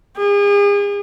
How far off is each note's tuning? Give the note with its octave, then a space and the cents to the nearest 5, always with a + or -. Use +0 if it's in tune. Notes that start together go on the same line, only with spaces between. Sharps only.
G#4 -40